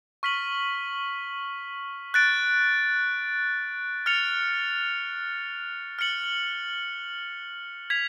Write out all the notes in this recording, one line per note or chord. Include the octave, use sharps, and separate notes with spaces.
C#6 F6 B6 F#7
F#6 A6 D7
F6 A6 C#7 F7
F6 A6 C#7 F#7
G#6 B6 F7